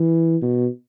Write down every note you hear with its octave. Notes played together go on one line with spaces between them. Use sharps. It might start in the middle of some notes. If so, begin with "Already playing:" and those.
Already playing: E3
B2